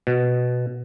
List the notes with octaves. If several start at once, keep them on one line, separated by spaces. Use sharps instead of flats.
B2